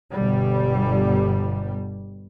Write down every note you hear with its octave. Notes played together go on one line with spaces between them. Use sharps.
G1 B2 G3